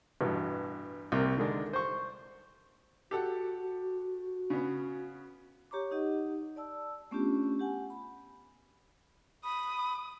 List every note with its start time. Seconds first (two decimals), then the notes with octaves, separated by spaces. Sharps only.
0.21 A1 G2 B2
1.12 C2 C3 A#3
1.37 D3 D#3 G#3 D4
1.73 C5 C#6
3.11 F#4 G4 A4 F#5
4.50 C#3 B3
5.71 G4 C#5 A#5 C#6 D6
5.91 D#4 G4 D#5 F#5
6.56 D5 A5 E6
7.11 A3 B3 C#4 D4 F4 G4
7.60 G4 F#5 G#5
7.90 B5
9.44 B5 D#6